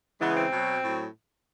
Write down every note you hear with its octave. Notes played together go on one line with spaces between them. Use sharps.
C#3 E3 G#3 B3
C4
B2 F#3
A2 F#3